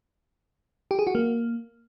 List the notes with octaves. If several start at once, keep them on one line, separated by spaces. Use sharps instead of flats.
G4
G#4
F#4
A#3